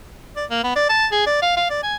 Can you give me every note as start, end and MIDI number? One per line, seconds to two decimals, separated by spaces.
0.36 0.45 74
0.50 0.63 58
0.64 0.72 59
0.76 0.86 74
0.89 1.07 81
1.12 1.24 68
1.27 1.40 74
1.42 1.52 77
1.57 1.66 77
1.70 1.83 74
1.83 1.96 80